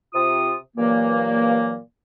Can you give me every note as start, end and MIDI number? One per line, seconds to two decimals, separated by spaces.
0.14 0.54 48
0.14 0.54 65
0.14 0.54 87
0.77 1.77 43
0.77 1.77 46
0.77 1.77 52
0.77 1.77 54
0.77 1.77 58